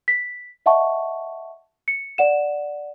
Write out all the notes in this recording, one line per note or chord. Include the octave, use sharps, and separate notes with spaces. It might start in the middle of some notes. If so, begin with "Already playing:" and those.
B6
D#5 E5 F#5 A5 C#6
C#7
D5 F#5 E7